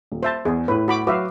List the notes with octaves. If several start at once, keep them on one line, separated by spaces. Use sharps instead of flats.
D#1
C5 E5 A5 C6
E2 G#4
A2 E4 B4
F#4 B5 D6
F#3 F#4 B4 E5 F5 D6